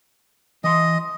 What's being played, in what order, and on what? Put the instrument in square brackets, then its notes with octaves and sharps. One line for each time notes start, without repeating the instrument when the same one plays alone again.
[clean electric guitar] E3 C6 [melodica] D#5